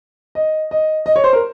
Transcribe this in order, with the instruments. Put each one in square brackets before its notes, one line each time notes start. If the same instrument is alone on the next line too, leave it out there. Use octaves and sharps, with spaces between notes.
[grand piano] D#5
D#5
D#5
C#5
C5
A#4